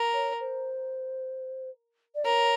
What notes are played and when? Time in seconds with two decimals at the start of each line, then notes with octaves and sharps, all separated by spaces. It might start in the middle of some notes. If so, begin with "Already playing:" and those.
Already playing: A#4
0.13 C#5
0.40 C5
2.15 D5
2.24 A#4 C#5